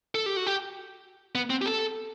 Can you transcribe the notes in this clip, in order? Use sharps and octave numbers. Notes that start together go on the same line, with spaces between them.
A4
G4
F#4
G4
B3
C4
G4
A4